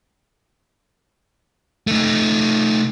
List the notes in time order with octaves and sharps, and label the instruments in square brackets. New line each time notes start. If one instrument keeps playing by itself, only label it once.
[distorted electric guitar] A3 D#4